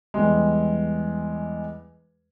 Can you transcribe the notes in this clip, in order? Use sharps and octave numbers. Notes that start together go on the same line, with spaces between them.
E2 G3 G#3